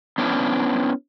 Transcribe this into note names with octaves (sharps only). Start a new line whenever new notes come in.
B3 C#4 D4 E4